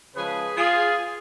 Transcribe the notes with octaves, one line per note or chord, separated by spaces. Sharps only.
C#3 F3 G#3 G#4 B4
F4 G#4